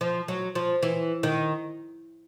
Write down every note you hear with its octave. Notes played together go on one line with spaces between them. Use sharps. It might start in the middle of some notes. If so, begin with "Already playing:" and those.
F3
F#3
F3
E3
D#3